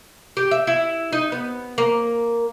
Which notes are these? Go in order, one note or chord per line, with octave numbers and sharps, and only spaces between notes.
G4
E5
E4
D#4
B3
A#3